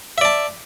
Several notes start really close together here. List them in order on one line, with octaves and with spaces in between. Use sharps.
E5 D5 A5